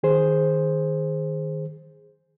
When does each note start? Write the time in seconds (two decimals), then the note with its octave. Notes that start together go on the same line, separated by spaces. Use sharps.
0.03 D#3 G#4 C5